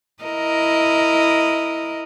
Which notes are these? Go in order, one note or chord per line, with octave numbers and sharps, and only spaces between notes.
E4 A#4 D#5